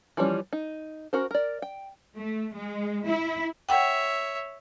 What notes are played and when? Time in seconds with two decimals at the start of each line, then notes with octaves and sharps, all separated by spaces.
0.17 E3 F3 G3 C#4
0.53 D#4
1.13 C#4 F#4 A#4 C5
1.31 A#4 D5
1.62 G5
2.16 A3
2.54 G#3
3.07 E4
3.69 C#5 E5 F#5 G5